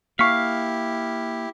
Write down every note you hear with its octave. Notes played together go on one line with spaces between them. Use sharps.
A#3 E4 G4 F5 C#6 B6